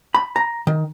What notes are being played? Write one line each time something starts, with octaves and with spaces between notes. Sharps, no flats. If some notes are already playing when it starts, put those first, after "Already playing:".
B5
A#5
D#3